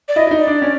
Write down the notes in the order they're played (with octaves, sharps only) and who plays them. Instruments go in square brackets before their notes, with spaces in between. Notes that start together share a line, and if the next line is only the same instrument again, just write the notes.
[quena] D5
[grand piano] E4 [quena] D#5
[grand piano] E4
D#4
[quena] D5
[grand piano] D4
C#4